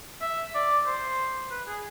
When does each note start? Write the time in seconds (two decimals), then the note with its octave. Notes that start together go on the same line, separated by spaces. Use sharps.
0.22 E5
0.55 D5
0.87 C5
1.51 B4
1.67 G#4